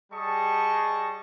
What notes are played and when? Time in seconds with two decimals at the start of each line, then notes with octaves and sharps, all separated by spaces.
0.12 G3 G#4 D#5 A5 C#6 D#6